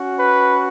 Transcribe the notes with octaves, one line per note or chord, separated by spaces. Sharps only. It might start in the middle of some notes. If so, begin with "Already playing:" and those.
Already playing: C#4 F#4
B4